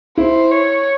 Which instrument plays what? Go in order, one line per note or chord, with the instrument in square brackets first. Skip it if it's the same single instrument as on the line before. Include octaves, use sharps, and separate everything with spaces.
[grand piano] E4 [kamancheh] C5
[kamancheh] C#5